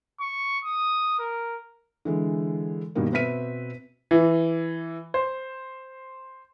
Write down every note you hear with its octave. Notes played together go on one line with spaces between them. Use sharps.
C#6
D#6
A#4
D3 E3 G#3
G2 B2 D#3 G3 A#3
B2 C4 B4 E5 B6 D#7
E3
C5